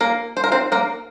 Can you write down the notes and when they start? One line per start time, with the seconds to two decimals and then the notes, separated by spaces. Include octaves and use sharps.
0.01 A#3 A#4
0.37 C5
0.44 A#4
0.52 C4 C5
0.72 A#3 A#4